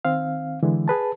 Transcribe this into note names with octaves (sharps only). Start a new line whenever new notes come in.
D#3 C4 F5
D3 E3 G#3
G#4 B4 A5